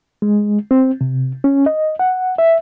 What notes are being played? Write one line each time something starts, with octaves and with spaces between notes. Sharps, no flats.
G#3
C4
C3
C#4
D#5
F#5
E5